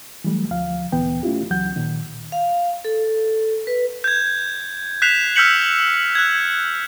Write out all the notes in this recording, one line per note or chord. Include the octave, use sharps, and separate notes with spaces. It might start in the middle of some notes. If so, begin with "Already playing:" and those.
E3 F#3 G3 A3
D2 F3 F5
D2 A#2 E3 B3 G5
A3 C#4 E4 F4 G4
C#2 E3 F#3 F#5 G6
A#2 D#3
F5
A4
B4
G6 G#6
F#6 G6 B6 C7 E7 F7
E6 F6 G6 B6 C#7 F#7
F#6 G#6